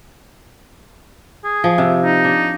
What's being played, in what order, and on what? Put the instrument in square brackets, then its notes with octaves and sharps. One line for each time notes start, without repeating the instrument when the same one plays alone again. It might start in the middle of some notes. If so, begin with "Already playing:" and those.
[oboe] G#4
[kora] F3
C3
[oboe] D#4
[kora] D4